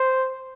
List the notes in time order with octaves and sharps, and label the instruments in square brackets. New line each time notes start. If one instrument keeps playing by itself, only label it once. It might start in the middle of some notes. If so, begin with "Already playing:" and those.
Already playing: [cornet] C5